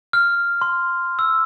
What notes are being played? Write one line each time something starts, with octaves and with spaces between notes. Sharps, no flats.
F6
C6
E6